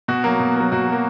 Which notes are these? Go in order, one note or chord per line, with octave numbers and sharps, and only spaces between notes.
B2 F#4
F#3 A#3
B2
F#3 A#3
B2 F#4
F#3 A#3